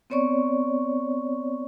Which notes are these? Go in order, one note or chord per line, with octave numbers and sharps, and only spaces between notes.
B3 C4 C#5 D5 C#6